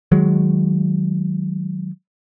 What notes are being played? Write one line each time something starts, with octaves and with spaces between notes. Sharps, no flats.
D#3 F#3 G#3